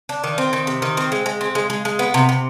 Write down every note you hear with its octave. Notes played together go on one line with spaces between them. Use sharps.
D4
D#3
C4
D#3
C3
D#3
C4
G#3
G#3
C4
G#3
G#3
G#3
B3
C3
C3